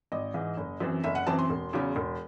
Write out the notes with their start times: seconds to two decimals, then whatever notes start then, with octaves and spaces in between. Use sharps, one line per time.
0.12 G#1 D#5
0.34 G#2 E3
0.57 F#1
0.80 F#2 E3 C4
1.03 F#1 E5
1.15 F#5
1.27 F#2 E3 C4 A5
1.39 C6
1.50 E1
1.73 E2 C#3 F#3 C#4
1.96 E1